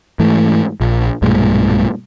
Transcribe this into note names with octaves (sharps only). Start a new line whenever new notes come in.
G#2 E3 A3
A#1
B1 G2 A#2 G#3